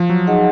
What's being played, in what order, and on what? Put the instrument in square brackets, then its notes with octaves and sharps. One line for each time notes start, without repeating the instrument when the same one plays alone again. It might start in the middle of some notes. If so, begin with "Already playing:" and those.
Already playing: [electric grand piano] F3
F#3
[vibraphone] D#4 G#4 D#5 F#5